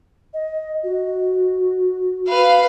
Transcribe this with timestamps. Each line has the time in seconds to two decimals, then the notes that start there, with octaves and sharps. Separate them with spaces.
0.34 D#5
0.84 F#4
2.28 B4 F5